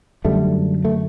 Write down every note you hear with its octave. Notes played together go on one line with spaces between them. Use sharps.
F#2 D3 G3 A3
A3